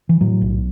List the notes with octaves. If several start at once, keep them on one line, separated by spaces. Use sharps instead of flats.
E3
A2 F#3
B1